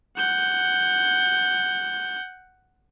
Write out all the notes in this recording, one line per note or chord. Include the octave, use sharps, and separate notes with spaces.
F#5 G6